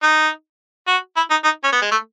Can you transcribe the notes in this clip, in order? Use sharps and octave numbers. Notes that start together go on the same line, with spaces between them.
D#4
F#4
E4
D#4
D#4
C#4
B3
G#3
A3